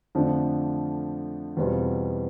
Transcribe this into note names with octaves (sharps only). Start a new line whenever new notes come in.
F2 D3 F3 A3 D4
E2 B2 G3 C4 F4